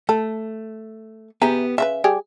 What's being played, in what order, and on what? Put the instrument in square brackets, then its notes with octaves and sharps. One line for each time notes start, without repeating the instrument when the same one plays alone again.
[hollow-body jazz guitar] A3 [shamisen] A4
[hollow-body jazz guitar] B3 G4 [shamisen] G#4 E5 A#5
[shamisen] C#3 F#4 B4 [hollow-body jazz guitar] E5
[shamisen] G3 G4 G#4